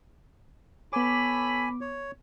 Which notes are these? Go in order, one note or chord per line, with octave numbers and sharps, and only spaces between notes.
B3 A4 C#5 G#5 B5 D6
C#5